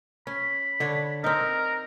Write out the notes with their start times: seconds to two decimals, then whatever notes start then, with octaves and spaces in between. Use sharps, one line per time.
0.27 C#4 B5
0.80 D3 D4 C#5
1.24 C4 D#4 A#4